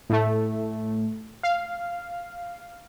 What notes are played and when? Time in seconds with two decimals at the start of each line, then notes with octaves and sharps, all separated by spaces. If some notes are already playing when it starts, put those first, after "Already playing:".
0.10 A2 A3
1.43 F5